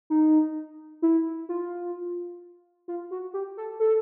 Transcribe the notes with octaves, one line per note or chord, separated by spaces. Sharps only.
D#4
E4
F4
F4
F#4
G4
A4
A4